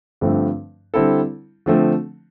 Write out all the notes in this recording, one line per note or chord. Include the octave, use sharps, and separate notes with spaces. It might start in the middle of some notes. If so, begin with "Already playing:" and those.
G2 D3 F3 A3 C4
D3 G3 C4 E4 A4
D3 F3 A3 C4